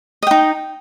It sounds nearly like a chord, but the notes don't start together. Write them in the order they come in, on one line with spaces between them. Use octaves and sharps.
D#5 G5 D#4